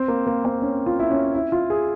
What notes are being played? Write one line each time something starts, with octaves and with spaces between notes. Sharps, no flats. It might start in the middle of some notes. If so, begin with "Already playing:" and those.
Already playing: C4
A#3
A#3
C4
C#4
F4
E4
C#4
E4
F4
G#4